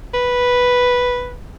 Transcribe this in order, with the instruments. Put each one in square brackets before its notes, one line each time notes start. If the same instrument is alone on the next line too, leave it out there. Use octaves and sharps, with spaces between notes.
[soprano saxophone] B4